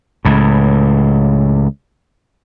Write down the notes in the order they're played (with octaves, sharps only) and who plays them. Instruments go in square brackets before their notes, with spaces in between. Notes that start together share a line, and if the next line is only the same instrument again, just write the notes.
[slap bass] C#2 A2